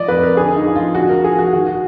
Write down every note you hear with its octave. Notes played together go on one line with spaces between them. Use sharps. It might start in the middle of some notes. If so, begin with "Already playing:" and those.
Already playing: F3 D5 D#5
F2 B4
A#4
D3 G#4
D#4
F3
F4
D3 F#4
A#4
F3 G#4
F#4
D#3 F#4
F#4